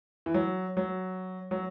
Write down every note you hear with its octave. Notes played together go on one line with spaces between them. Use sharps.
E3
F#3
F#3
F#3